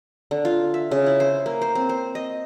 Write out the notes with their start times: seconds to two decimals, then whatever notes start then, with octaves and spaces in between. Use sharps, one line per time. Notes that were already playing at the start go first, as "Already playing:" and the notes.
0.31 D3
0.45 F4
0.74 E5
0.91 C#3
1.06 E4
1.20 C5
1.46 A#3
1.62 C5
1.75 C4
1.89 C5
2.15 D#5